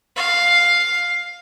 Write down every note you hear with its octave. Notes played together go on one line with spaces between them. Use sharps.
F5